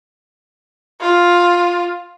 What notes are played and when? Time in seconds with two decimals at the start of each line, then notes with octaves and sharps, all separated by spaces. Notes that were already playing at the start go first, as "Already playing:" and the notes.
1.01 F4